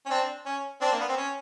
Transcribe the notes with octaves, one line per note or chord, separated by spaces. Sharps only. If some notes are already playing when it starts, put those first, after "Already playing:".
C#4
C4 D4
C#4
C4 D4
A#3
B3
C4
C#4